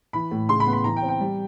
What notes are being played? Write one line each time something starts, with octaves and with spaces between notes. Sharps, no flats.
E3 B5
A2
C#3 C6
B5
B3
B5
E3 A#5
G5
C4
G5
G3